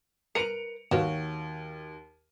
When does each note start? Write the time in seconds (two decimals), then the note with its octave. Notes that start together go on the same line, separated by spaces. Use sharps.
0.35 A#4 B4 C#7 D7 F7
0.91 D#2 F#4 C#5 F5